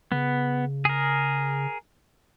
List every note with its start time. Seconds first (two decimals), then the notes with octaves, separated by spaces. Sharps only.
0.12 C#3 B3
0.85 G#4 A#4